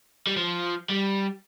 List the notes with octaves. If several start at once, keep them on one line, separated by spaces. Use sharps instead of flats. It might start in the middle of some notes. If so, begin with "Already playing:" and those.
G3
F3
G3